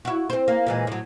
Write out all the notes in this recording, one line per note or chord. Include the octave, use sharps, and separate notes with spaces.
E4 F#4
C4 C5
A#3
A#2 E3 G#3
A2 F#3